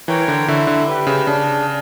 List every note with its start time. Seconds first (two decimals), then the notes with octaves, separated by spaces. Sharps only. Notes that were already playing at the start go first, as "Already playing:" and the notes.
0.08 E3 A#4 C#5 G5
0.28 D3
0.48 D3 E4
0.67 D3
0.87 G4 B4
1.07 C#3
1.26 C#3 D4